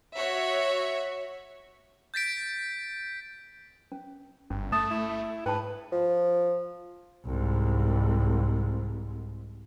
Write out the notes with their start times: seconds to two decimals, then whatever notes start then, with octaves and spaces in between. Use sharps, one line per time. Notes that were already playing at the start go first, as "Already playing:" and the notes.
0.15 F#4 C#5 E5
2.14 G6 A6 B6 D7
3.92 C#4
4.51 G1 C#4
4.72 A3 A5 D#6
4.91 E4
5.46 G#2 B4 G5 A5
5.92 F3
7.26 C2 G#2